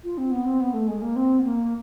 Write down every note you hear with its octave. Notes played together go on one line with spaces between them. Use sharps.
F4
C4
B3
C4
B3
A3
G#3
A#3
C4
B3
A#3